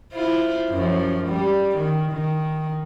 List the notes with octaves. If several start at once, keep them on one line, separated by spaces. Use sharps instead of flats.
E4 F4 C5
F#2 F3
G3
D#3
D#3